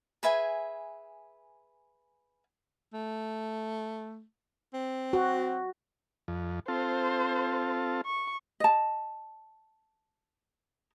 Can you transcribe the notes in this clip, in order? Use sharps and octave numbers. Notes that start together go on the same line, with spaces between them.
G#4 B4 E5 G#5
A3
C4
F#4
F2
C4 F4 A4 C5
C#6
D#5 A5